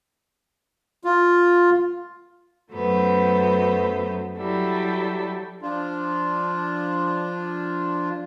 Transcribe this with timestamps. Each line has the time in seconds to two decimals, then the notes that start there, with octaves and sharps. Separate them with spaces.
1.04 F4
2.72 F#2 F#3 A3 B3 C5
4.38 F#3 G3 E4 A4
5.62 F3 D4 F4